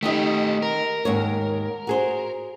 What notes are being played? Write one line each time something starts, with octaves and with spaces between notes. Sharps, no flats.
D#3 A3 D#4 G4 D#5
A#4
D#2 G#2 C#5
F#4 G#4 C5